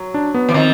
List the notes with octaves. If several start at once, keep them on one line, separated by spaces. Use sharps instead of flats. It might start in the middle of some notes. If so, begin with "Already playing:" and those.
Already playing: F#3
D4
B3
E3
D#3 F3 C4